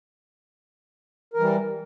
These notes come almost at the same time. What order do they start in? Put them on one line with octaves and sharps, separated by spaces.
A#4 E3 G3